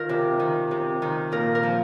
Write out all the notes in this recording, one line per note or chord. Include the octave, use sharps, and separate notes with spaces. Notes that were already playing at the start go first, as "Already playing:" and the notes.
Already playing: D#3 F4 A#4
C3
D#3
C3
D#3
A#2 A#4
A#4
F3